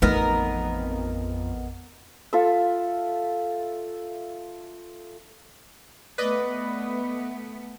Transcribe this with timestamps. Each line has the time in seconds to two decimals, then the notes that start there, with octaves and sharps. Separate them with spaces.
0.02 A1 F2 A3 B3 D#4 A#4 D#5
2.33 F4 A4 E5
6.18 A3 B3 B4 D5 D#5